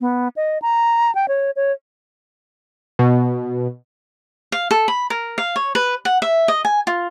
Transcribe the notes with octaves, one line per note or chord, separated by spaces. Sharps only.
B3
D#5
A#5
G5
C#5
C#5
B2
F5
A4
B5
A#4
F5
C#5
B4
F#5
E5
D#5
G#5
F4